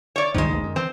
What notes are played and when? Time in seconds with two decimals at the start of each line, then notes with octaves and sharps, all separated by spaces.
0.16 C#5 D5
0.34 C#2 G2 D#3 F3 G#3
0.48 G#1 D#2 G#2
0.63 F#2
0.76 E3 C4